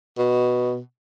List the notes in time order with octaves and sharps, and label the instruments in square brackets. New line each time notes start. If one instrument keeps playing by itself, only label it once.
[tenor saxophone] B2